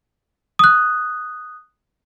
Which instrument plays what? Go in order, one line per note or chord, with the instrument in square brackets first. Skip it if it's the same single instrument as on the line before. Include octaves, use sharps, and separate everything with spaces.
[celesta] D#6 F#6